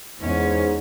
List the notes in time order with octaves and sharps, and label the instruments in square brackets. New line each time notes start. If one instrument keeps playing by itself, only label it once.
[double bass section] E2 [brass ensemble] G#2 [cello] C#4